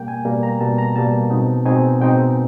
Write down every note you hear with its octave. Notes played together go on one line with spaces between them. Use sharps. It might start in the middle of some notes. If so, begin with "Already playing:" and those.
Already playing: B2 G3 A#3 G5
G#5
B2 G3 A#3
A#5
B2 G3 A#3 A5
A#5
B2 G3 A#3 A5
B2 G#3 C4 D#4
B2 G#3 C4 D#4 G#5
B2 G#3 C4 D#4 G5